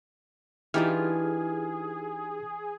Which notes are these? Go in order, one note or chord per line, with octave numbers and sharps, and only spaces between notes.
E3 D4 D#4 F4 G4 G#4 F6